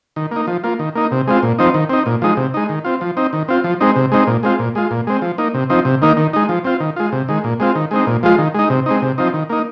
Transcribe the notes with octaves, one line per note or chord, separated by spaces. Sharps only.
D#3
A#3 D#4
F3
A#3 F4
D#3
A#3 D#4
C3
G#3 C4 F4
A#2
F3 C4 D#4
D#3
C4 D#4
A#2
F3 G#3 D#4
C3
G#3 D#4
D#3
C4 F4
F3
C4 D#4
D#3
C4 F4
F3
G#3 C4 D#4
C3
G#3 C4 D#4
A#2
G#3 C4 F4
A#2
G#3 F4
A#2
G#3 C4
F3
A#3 D#4
C3
F3 C4 D#4
C3
D#3 A#3 D#4
D#3
G#3 D#4
F3
C4 F4
D#3
G#3 F4
C3
D#3 G#3
A#2
G#3 C4 F4
D#3
G#3 C4 D#4
A#2
F3 G#3 F4
D#3
G#3 D#4
C3
G#3 C4 D#4
C3
F3 C4 D#4
D#3
A#3 D#4